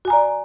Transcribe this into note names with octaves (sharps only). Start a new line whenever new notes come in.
F#4 D5 G#5 A#5